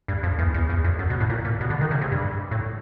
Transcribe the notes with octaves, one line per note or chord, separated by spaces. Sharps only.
G2
F2
E2
E2
E2
F2
F#2
B2
A2
A#2
A#2
B2
D3
D#3
C#3
C3
G2
A2